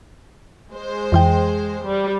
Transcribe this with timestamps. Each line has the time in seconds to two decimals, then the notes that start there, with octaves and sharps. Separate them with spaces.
0.71 G#3 C5
1.12 F2 E3 G5
1.85 G3